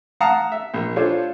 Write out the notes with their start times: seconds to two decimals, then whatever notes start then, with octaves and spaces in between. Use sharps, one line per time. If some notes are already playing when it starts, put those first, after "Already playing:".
0.20 F5 F#5 A5 A#5 D#6
0.52 E5
0.74 A#1
0.96 D4 F4 A4 C5 C#5